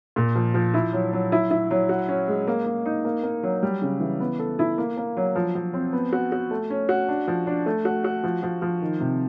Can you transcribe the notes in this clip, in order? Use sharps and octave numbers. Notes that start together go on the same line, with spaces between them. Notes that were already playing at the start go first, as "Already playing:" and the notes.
A#2
F3
F3
E4
F#3
F#3
E4
E4
F#3
F#4
C#4
G#3
A#3
A#3
D#4
A#3
A#3
F#3
G3
C#3
E3
B3
A4
E4
A#3
A#3
F#3
F3
F3
C4
B3
F#4
F#4
A3
C#4
F#4
D4
F3
D4
A3
F#4
F#4
F3
F3
F3
D#3
C3